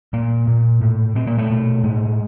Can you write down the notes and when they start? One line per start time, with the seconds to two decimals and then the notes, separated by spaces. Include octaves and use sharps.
0.13 A#2 A#3
0.48 A#2
0.82 A2
1.15 A#2 C4
1.27 A#3
1.38 A3
1.50 B2
1.84 A2 G#3